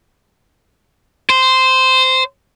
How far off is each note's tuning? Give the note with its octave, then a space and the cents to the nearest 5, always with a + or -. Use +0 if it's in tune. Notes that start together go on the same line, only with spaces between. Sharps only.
C5 -10